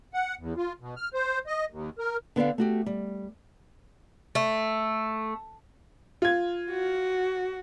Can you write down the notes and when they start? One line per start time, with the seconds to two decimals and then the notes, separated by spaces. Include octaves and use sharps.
0.14 F#5
0.38 E2
0.57 F4
0.80 B2
0.96 F6
1.14 C5
1.47 D#5
1.70 D#2
1.99 A#4
2.36 D3 B3 D4 F5
2.58 A3 F#4 G4
2.86 G3
4.35 A3
6.22 F4 G#6
6.71 F#4